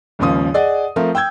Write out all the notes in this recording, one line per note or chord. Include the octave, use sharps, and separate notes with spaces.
G#1 D#2 C#3 F3 D#6
G#4 D5 D#5 F#5
F3 A3 C4 A#4
G5 E6 G6 G#6